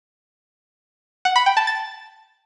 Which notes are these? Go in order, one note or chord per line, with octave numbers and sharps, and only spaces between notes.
F#5
B5
G5
A5
A6